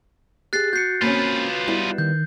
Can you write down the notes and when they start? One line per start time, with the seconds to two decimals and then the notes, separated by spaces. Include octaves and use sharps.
0.53 G4 G#4 F#6 A6 C7
0.73 F#4 G6 C7 C#7
1.02 A#3 C4 C#4 F4 B4
1.68 G3 B3 E4
1.98 D#3 G6